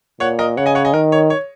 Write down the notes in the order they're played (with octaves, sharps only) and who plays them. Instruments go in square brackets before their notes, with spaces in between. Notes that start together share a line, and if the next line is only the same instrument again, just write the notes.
[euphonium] A#2 [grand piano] C#5 F#5
[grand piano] A#4 D#5
[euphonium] C#3 [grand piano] C#5 F#5
[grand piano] D#5 G#5
C#5 F#5
D#5 G#5
[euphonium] D#3 [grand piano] A#4
[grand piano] C#5
C#5